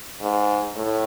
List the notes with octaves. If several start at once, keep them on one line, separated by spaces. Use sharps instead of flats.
G#2
A2